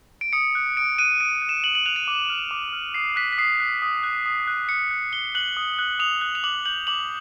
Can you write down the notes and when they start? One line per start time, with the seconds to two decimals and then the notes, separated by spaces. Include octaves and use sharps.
0.21 D7
0.33 D#6 C#7
0.55 F#6
0.77 D#6 D7
0.98 F#6 D#7
1.20 D#6 D7
1.42 F#6
1.49 E7
1.64 D#6 F#7
1.75 F#7
1.86 F#6 F7
1.96 D#7
2.08 D6
2.30 F6
2.51 D6
2.73 F6
2.94 D#6 C7
3.16 F#6 B6
3.32 B6
3.38 D#6 C7
3.60 F#6
3.82 D#6
4.03 F#6
4.26 D#6
4.47 F#6
4.69 D#6 C#7
4.91 F#6
5.12 D#6 G7
5.35 F#6 F#7
5.57 D#6
5.79 F#6
5.99 D#6 F7
6.21 F#6
6.35 F7
6.44 D6 F#7
6.66 G6 F#7
6.87 D6 F#7